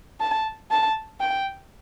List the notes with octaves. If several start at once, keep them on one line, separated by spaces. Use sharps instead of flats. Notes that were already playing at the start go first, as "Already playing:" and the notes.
A5
A5
G5